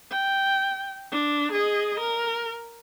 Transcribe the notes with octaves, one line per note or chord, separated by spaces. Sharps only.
G5
D4
G#4 D#5
A#4